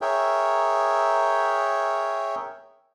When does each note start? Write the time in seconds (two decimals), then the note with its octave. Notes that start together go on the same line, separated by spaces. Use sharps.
0.01 G#4 A#4 C#5 E5 G5